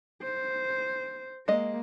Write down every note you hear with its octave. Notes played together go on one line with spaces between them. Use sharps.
C5
G#3 A#3 D#5